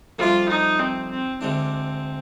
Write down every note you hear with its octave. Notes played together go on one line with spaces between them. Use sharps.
F2 C3 G3 D4 F4
D#4
C4
C4
D2 D3 G#3 C4 D4